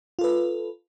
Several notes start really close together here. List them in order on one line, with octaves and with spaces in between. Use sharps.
F4 A4 B4